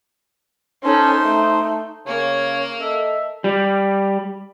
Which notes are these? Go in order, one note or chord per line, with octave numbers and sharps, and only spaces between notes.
C#4 D#4 A4 C5 C6
A3
C#3 A#3 C#4 C#5
A4 D#5 E5
G3